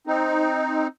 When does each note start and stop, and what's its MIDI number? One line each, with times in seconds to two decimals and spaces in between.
0.07 0.87 60
0.07 0.87 63